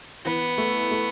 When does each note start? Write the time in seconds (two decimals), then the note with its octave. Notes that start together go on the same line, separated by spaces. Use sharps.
0.25 E3 B3
0.58 A3
0.91 A3